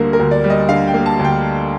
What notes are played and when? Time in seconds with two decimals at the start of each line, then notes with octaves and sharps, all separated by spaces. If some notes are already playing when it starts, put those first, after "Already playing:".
Already playing: D2 D3 G3 A#3 A#4
0.13 A#4
0.19 D2
0.31 D5
0.44 G3
0.50 D#5
0.69 D3 F5
0.87 G5
0.94 A#3
1.06 A5
1.19 D2
1.24 G5